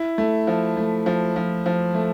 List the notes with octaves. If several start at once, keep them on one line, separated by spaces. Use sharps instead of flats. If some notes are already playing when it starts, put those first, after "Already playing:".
Already playing: E4
A3
F3
A3
F3
F3
F3
A3